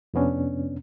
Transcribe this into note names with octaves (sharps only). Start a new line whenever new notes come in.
F2 C3 B3 C#4 D4